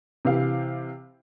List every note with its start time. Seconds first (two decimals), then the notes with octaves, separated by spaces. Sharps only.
0.25 C3 E3 G4 F5